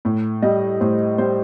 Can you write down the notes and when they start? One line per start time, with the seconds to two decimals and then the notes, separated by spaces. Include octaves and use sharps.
0.05 A2
0.42 G3 D#5
0.81 A2 C5
1.18 G3 C5